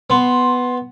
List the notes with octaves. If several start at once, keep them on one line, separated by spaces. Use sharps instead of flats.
B3 C6